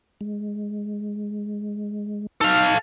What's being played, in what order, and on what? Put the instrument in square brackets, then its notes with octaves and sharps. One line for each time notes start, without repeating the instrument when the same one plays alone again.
[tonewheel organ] G#3
[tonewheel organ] D#4 [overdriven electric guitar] A4 F5